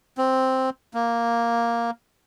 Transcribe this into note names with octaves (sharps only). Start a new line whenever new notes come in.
C4
A#3